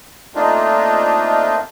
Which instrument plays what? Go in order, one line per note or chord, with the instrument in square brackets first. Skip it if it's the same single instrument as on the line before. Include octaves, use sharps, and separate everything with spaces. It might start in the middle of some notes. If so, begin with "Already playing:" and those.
[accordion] A3 A#3 C4 D4 D#4 F4